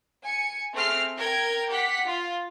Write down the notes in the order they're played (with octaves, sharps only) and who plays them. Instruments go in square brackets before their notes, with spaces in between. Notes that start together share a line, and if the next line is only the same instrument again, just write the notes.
[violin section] G#5 C#7
A3 C4 G#4 F6 C7
A#4 G5 G#6
G4 F#5 B6
F4